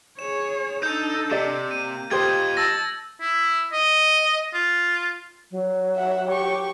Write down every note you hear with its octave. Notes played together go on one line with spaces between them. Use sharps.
G#4 C#5 E7
D4 D#4 A4 G6
C3 G4 D5 D#5
A#3 D#7
F4 G4 C5 D#5 G#6 D#7
A5 E6 A6 A#6
E4
D#5
F4
F#3
E5 F#5
G4 C#6